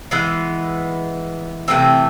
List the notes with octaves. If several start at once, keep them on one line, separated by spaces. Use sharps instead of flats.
E3 G#3 B3
C3 E3 A3 C4 G5